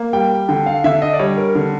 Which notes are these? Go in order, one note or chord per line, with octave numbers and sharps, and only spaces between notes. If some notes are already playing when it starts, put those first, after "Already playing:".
Already playing: A#3
G3 G5
D3 G5
F5
D3 E5
D#5
D5
G3 C#5
A#4
D3